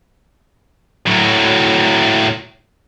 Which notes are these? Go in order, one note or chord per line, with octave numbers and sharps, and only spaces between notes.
A2 F#3